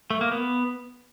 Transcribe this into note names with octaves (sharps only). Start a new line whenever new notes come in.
A3
A#3
B3